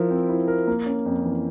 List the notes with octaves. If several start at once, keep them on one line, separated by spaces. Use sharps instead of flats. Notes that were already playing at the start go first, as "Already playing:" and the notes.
Already playing: F3 E4 A#4
C4
E4
A#4
A#3
C#4
F2
E3